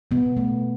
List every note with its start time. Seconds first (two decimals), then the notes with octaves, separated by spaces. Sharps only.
0.11 B2 B3
0.37 A3